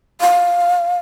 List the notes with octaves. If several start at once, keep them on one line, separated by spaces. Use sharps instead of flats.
F5